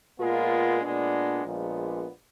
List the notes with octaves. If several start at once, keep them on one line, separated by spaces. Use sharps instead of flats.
A#2 G#3 B3 F4 A#4
A#2 G#3 B3 D4
A#1 A#2 F3 G#3 B3